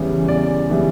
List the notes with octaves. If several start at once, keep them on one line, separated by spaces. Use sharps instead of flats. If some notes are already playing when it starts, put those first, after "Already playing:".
Already playing: E2 C#3 E3 G3 B3
E2 D5
C#3 E3 G3 B3